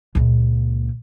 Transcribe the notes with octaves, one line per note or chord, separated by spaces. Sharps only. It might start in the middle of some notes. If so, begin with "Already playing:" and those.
C#2 A#2